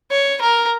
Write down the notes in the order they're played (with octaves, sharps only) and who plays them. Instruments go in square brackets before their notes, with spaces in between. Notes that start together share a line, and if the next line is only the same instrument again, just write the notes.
[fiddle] C#5
A#4